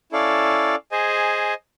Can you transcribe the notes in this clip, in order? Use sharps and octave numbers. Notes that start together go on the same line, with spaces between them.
C#4 E4 A4 D5 F5
G#4 C5 D#5 G#5